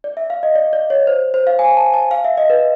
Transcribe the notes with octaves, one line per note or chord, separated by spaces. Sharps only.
D5
E5
F5
D#5
D5
D5
C#5
C5
C5
F5
G#5
A5
A5
F5
E5
D#5
B4